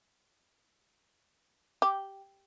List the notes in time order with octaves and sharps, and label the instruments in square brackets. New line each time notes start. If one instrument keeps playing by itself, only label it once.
[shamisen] G4